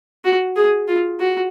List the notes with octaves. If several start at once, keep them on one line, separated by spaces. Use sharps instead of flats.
F#4
G#4
F4
F#4